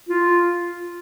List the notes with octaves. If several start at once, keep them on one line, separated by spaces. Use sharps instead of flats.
F4